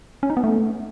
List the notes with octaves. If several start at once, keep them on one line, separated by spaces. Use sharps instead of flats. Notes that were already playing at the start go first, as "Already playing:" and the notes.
C#4
D#4
B3
A3